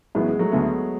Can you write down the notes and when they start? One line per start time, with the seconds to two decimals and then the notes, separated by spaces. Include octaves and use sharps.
0.15 A1 A2 F#3 G#3 B3
0.28 G#3
0.39 F#3 A3
0.52 D2 D3 G#3 A3 B3